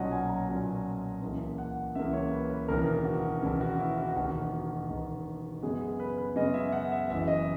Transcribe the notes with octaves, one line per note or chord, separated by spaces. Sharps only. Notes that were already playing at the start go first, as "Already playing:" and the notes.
Already playing: B1 A#2 F#3 C#4 D#5 F#5
G#5
A#5
B1 A#2 F#3 C#4
C#2 C#3 E3 A#3
F#5
C#2 C#3 E3 A#3 E5
C#5
B4
B4
E1 D#2 C#3 E3 A#4
F#4
E1 D#2 C#3 E3 E4
F#4
E4
F#4
E1 D#2 D#3 F#4
F#4
E1 D#2 D#3
F#2 C#3 G#3 B3 G#4
G#4
B4
B4
F#2 C#3 G#3 B3 D#5
E5
F#5
E5
F#1 F#2 E3 E5
D#5